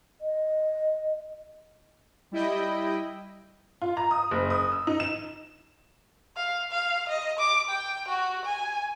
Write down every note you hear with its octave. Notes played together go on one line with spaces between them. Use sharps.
D#5
G3 E4 D#5 G5
F4
A#5
D#6
F#1
D#6
E6
D#4
E7
F5
F5
D#5
D6
G5
F#4
G#5